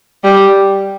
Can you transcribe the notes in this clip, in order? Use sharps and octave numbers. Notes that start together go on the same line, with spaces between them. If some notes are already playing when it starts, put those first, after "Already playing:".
G3